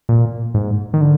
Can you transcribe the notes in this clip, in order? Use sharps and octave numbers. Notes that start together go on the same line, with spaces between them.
A#2
G#2
D#3
D3